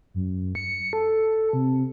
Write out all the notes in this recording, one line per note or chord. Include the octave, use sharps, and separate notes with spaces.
F#2
C#7
A4
C3